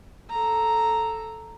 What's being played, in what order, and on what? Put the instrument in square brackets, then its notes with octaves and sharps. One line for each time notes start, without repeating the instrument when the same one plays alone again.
[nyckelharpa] A4 A#5